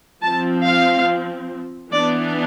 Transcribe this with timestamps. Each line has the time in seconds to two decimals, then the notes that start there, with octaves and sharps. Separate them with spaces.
0.23 F3 C4 A5
0.65 F5
1.91 E3 B3 D4 D5